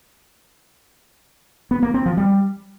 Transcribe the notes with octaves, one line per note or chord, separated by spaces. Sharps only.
B3
A#3
C4
F3
G3